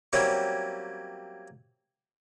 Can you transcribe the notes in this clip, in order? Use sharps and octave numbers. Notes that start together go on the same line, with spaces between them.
F#3 G3 A#3 C4 C#4 E4